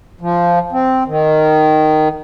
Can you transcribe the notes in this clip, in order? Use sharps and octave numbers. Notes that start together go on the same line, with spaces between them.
F3
C4
D#3